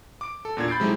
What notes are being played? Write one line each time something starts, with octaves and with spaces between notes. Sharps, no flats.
D6 D7
A4
E2 A#2 D4 G#6
B5 G6 A6 C7 D7
C3 F#3 G#3 A3 D#4 E4